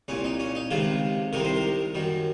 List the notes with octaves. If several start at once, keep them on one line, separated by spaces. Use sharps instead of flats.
C2 A#2 C#4
D#4
C#4
D#4
C#2 C3 D#3 F4
C2 C3 D#3 A#4
C5
A#4
F#2 D#3